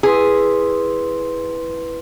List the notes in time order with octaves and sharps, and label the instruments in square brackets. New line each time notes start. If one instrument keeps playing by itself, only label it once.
[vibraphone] E4 B4 C6 [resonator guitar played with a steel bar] G#4